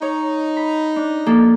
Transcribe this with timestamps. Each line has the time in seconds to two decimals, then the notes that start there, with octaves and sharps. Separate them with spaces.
0.02 D#4 C#5
0.57 B5
0.96 D4
1.26 F3 A#3 A4